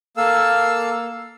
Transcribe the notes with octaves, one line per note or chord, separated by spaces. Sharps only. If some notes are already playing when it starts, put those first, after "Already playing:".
A#3 A4 F5 E6